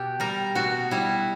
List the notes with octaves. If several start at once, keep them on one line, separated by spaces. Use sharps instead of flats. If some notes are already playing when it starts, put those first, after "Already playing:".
Already playing: B2 G4
G3 A#4
B2 F#4
G3 E4